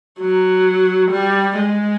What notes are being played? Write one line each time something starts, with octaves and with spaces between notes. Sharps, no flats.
F#3
G3
G#3